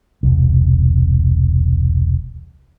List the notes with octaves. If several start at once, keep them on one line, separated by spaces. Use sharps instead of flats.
E1 C2